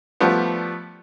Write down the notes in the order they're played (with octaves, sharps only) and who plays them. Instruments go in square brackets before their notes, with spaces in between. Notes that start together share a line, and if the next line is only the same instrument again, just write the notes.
[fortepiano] F3 G3 A3 B3